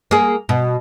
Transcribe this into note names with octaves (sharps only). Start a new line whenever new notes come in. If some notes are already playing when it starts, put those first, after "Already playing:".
A#3 G#4
B2